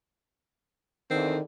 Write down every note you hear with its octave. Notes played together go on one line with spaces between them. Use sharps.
E2 D3 D#3 C4